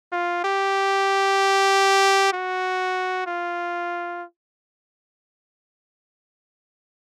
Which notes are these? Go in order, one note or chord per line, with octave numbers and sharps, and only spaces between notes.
F4
G4
F#4
F4